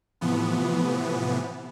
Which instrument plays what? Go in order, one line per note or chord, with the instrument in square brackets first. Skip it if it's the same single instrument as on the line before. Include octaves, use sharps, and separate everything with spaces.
[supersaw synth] A2 C3 E3 F3 B3